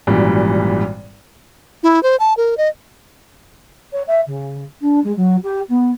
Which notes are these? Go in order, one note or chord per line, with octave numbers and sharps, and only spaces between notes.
G#1 F#2 A#2 E3 G3
E4
C5
A5
A#4
D#5
C#5
E5
C#3
D4
G#3
F#3
G4
B3